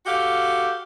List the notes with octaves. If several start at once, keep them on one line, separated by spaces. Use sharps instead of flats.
F#4 G4 A4 F5